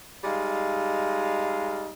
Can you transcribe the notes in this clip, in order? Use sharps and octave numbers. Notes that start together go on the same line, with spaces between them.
G3 G#3 D#4 F5